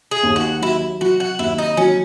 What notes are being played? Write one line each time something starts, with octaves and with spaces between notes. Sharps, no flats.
G#4
D#2
F#4
F#3 E4
F#3 F#4
F#4
D#2 E4
D#4
F#3 C#4